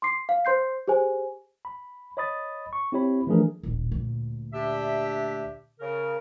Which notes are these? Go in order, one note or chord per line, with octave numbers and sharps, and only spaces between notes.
C6 D6 C7
F5
C5 C6 G6 C7
G4 G#4 C5 G#5
B5
C#5 D#5 B5 D#6 A6
C#6
C4 E4 G4 C#5 B5
E3 F3 A3 D4 G#4 A#4
D#1 A1
D2 A#2
D4 G4 E5
C#3 A#4